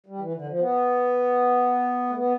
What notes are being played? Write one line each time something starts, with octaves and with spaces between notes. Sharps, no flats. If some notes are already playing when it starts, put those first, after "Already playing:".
G3
E3
D3
E3
F3
B3
A3
B3